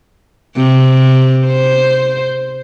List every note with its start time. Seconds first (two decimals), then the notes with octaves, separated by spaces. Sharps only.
0.57 C3
1.47 C5